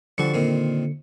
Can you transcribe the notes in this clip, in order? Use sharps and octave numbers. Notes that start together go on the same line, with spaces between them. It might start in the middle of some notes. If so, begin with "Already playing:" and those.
D3 F3 G3 F#4 C#7
A#2 D#3 C4